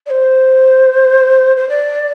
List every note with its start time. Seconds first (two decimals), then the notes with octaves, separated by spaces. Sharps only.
0.06 D5
0.10 C5
1.56 C5
1.69 D5